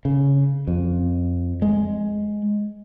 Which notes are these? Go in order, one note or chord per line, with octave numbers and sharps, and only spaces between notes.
C#3
F2
G#3